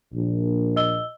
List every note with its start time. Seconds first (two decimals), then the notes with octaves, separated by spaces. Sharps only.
0.13 A#1
0.76 D#5 E6 G7